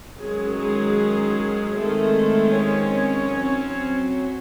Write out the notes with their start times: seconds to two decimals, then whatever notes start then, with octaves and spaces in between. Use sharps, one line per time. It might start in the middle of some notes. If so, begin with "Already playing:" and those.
0.18 D#3 F#3 G#3 C#4 G#4
0.57 G#3 G#4
1.75 D#3 G#3 A3 C4 A4
2.54 C#4 C#5
3.33 F#3 C4